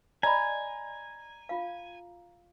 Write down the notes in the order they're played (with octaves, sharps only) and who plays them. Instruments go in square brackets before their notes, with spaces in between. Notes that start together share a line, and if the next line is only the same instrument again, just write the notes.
[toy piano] D5 D#5 B5 [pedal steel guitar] G#5 [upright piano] A#5
[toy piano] F4 F5